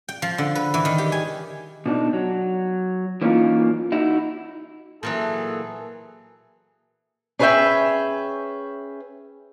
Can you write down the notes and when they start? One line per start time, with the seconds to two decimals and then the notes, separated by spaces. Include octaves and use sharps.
0.09 G5
0.22 F3
0.38 D3
0.55 B4
0.74 E3
0.85 D#3
0.98 G4
1.12 G#5
1.86 B2 D4 D#4
2.13 F#3
3.21 E3 A#3 C#4 D#4 F4
3.92 D#4 E4 F#4
5.03 A#2 E3 F#3 A#3 G#4 A4
7.39 C#4 G#4 B4 C5 E5 G5